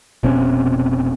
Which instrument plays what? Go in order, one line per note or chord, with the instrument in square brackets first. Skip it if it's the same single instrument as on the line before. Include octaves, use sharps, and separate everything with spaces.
[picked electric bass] F1 B2 C4 C#4